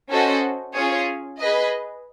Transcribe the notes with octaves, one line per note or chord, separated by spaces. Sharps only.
C#4 F#4 A4 C5 D#5
C#4 F4 G#4 C#5
G#4 B4 D#5